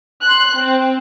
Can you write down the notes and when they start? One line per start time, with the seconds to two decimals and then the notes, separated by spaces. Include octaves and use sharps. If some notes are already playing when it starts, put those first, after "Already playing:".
0.22 C6 F#6
0.56 C4